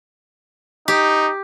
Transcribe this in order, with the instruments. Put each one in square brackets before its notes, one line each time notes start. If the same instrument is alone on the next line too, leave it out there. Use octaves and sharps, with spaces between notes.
[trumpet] D#4 [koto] G4